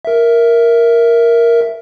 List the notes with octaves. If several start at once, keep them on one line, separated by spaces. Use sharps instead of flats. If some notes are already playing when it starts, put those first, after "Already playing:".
A#4 E5